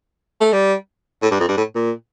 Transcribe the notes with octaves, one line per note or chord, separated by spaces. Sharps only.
A3
G3
A2
G2
F2
G2
A2
A#2